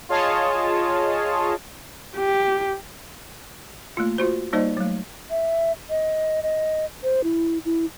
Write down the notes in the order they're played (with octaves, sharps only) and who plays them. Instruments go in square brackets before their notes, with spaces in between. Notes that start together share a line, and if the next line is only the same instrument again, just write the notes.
[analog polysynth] F4 G#4 C#5 D#5 A5
[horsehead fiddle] G4
[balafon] A3 A#3 F4
F4 F#4 C5
G3 A#3 D#4 C5 D5 D#5
F#3 A3
[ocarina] E5
D#5
D#5
C5
E4
E4